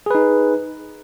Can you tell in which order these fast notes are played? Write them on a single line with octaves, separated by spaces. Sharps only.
G#4 B4 D#4